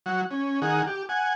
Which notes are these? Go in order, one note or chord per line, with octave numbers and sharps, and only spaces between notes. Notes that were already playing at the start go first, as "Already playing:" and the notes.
F#3 F#5
C#4
D#3 G#4 F#5
G4
F#5 G#5